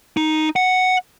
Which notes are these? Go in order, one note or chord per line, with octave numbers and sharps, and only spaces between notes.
D#4
F#5